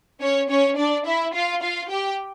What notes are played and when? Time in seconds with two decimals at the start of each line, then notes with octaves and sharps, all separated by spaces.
0.21 C#4 C#5
0.50 C#4 C#5
0.78 D4 D5
1.06 E4 E5
1.34 F4 F5
1.62 F4 F5
1.90 G4 G5